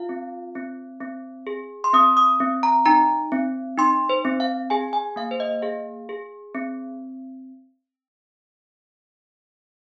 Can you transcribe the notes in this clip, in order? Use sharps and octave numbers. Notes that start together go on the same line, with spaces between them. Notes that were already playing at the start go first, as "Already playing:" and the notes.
Already playing: F4 F5
C4
C4
C4
G#4
C6
C4 D#6
D#6
C4
A#5
D#4 A#5
C4
D#4 C6
C5
C4
F5
G#4 G#5
G#5
A#3 F5
C5
D#5
G#4 F5
G#4
C4